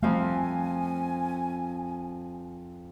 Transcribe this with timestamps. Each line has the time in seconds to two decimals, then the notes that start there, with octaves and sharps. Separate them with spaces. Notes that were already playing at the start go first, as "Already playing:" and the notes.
0.02 F2 F3 G3 A3 F5 G#5